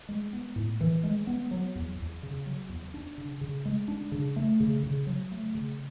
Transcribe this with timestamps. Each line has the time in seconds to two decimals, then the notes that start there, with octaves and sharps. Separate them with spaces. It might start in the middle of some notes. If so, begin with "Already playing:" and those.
0.09 G#3
0.33 B3
0.56 A2
0.81 E3
1.04 G#3
1.27 B3
1.51 F#3
1.75 E2
1.99 E2
2.23 C#3
2.46 F#3
2.69 E2
2.94 D4
3.18 C#3
3.41 C#3
3.65 G#3
3.88 D4
4.12 C#3
4.36 A3
4.60 C#3
4.83 C#3
5.07 F#3
5.32 A3
5.55 C#3